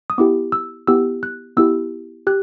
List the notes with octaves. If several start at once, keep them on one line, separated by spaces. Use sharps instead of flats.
D#6
B3 E4 G4 D6
E6
B3 E4 G4 E6
F#6
B3 E4 G4 E6
G4 F#6